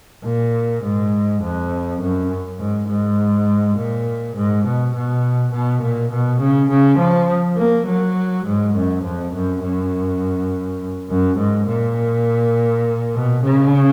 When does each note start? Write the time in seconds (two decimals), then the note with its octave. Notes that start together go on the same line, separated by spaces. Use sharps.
0.25 A#2
0.84 G#2
1.42 F2
2.01 F#2
2.59 G#2
2.88 G#2
3.77 A#2
4.36 G#2
4.65 B2
4.95 B2
5.52 B2
5.82 A#2
6.12 B2
6.40 C#3
6.70 C#3
6.99 F3
7.57 A#3
7.87 F#3
8.46 G#2
8.75 F#2
9.04 F2
9.34 F#2
9.63 F#2
11.10 F#2
11.38 G#2
11.68 A#2
13.15 B2
13.43 C#3